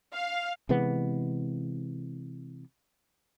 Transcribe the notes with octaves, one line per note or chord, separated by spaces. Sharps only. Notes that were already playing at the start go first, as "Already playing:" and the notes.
F5
C3 E3 G#3 B3